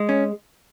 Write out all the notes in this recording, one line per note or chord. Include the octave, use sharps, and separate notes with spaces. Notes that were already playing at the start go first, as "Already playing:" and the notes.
Already playing: G#3
C#4